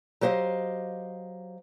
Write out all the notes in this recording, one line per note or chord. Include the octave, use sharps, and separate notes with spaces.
F#3 G4 C5 D#5 F5